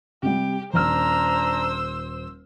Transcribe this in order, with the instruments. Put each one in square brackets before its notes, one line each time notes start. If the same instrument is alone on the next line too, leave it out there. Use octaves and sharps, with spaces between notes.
[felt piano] C3 G3 [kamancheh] G4
[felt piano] D#1 F6 [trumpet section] D4 A#5 [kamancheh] C5 E6